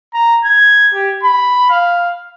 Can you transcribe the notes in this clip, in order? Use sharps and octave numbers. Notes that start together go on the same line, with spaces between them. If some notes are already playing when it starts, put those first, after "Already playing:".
A#5
G#6
G4
B5
F5